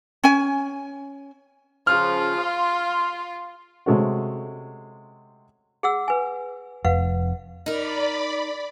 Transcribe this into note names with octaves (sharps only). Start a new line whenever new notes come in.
C#4 G#5
C#3 F3 F4 F6
F5 C6
C3 G#3 A3 C#4 F#4
G#4 F#5 E6
B4 G#5
F1 F2 B4 F5 F#5
D#4 A#4 D5 B5